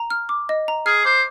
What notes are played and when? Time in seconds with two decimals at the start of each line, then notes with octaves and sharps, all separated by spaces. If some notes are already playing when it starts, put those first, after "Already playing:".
Already playing: A#5
0.10 F6
0.29 D6
0.49 D#5
0.68 A#5
0.86 G#4 F6
1.05 C5 D6